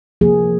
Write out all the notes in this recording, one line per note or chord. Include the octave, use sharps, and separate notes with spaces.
C3 F3 A#3 G#4